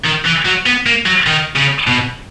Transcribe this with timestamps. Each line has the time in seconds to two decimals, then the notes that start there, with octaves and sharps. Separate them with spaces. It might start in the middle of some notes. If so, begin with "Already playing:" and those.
0.06 D#3
0.26 E3
0.46 F#3
0.66 B3
0.86 A#3
1.06 F#3
1.27 D#3
1.56 C#3
1.87 B2